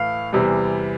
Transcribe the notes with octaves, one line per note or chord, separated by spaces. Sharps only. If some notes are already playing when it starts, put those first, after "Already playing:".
Already playing: A2 E3 A3 F5
E2 C3 E3 G3